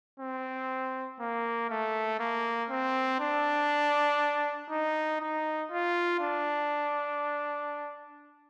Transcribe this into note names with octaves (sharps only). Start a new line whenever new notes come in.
C4
A#3
A3
A#3
C4
D4
D#4
D#4
F4
D4